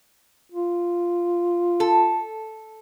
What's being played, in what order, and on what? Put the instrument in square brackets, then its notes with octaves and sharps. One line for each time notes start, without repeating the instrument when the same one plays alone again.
[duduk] F4
[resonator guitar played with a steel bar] A4